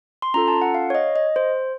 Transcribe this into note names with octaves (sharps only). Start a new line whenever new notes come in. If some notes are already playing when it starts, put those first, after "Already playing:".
C6
C#4 F4 A4 A#5
A5
F#5
F5
C#5
D#5
D#5
C5